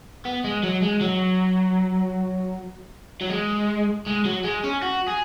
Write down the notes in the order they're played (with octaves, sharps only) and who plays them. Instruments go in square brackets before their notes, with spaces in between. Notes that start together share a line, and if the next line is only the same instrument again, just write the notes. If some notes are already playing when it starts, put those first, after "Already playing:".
[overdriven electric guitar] B3
G#3
F#3
G#3
F#3
F#3
G#3
G#3
F#3
G#3
C#4
F#4
G#4